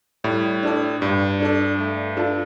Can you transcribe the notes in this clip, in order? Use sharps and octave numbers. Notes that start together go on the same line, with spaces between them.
A2 G3
D4 A4 D5
G2 G3
D4 A4 D5
A3
D4 F4 A4